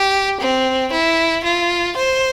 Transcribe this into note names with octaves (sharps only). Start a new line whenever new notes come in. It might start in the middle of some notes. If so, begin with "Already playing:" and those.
Already playing: G4
C4
E4
F4
C5